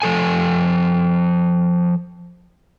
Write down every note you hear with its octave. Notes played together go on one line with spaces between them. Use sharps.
F3 A4 G#5